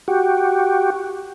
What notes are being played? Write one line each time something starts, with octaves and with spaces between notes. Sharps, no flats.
F#4 G4